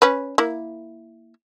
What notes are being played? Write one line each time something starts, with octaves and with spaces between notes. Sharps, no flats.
C#4 B4
A#3 E4